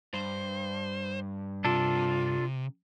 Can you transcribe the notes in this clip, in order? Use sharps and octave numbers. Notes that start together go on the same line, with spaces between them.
G2 C5
C3 D4 F4 A4